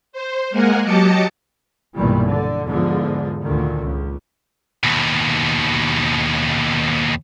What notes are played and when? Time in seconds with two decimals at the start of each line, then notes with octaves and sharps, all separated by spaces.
0.13 C5
0.50 G#3 A#3 A#4 F#5 G#5
0.83 F#3 G4 D#5 A5 D6 C#7
1.96 B1 G2 A#2 D#3 E3 G3
2.26 D3
2.67 E2 G#2 D3 F3 G#3
3.41 D2 A#2 D3 D#3
3.82 C#2
4.84 D#2 B2